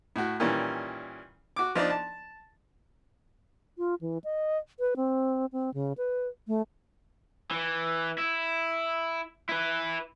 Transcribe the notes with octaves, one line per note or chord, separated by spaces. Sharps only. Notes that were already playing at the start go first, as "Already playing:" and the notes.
A2 F#4
A#2 D#3 E3 G3 C#4
F#4 D6
F3 D4 D#4 D5
A5
F4
E3
D#5
B4
C4
C4
C#3
B4
A3
E3
E4
E4 B4